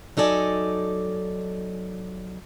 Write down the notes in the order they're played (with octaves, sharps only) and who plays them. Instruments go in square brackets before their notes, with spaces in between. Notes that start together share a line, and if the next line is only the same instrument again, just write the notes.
[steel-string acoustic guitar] F#3 D#4 A4 D5 G#5